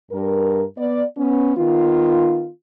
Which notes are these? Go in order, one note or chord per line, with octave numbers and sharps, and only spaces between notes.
G2 A#4
B3 D5
B3 C#4
D#3 B3 F4